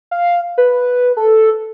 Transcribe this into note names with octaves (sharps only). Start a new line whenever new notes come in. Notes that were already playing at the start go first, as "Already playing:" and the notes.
F5
B4
A4